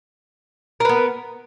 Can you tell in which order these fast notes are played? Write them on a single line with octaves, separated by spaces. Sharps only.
A#4 B4 B3